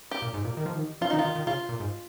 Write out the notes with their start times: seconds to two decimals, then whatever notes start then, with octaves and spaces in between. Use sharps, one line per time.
0.11 G4
0.22 A#2
0.34 G#2
0.45 A#2
0.57 D#3
0.66 F3
0.75 D#3
1.01 F3 F4
1.10 D#3 D#4
1.19 F4
1.25 D#3
1.36 D#3
1.47 C#3 F4
1.69 A#2
1.80 G#2